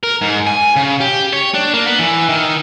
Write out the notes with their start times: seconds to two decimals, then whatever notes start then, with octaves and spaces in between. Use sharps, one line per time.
0.03 A#4
0.21 G#2
0.47 G#5
0.76 C#3
1.00 G4
1.33 C#5
1.54 D4
1.74 A#3
1.86 B3
1.99 E3
2.29 D#3